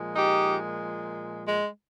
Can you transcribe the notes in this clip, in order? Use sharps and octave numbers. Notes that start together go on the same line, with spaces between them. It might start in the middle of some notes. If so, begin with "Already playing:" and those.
Already playing: A#2 F3 G#3
D#4 G4
G#3